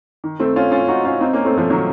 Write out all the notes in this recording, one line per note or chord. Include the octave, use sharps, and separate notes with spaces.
D#3
A3 C4
C#4 F4
C#4 F4
D#4 F#4
C#4 F4
C4 D#4
A#3 C#4
A3 C4
F3 A3
D#3 F#3